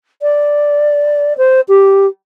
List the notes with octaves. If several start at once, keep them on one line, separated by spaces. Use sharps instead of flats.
D5
C5
G4